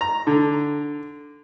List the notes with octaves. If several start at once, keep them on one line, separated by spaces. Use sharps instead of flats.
A#5
D3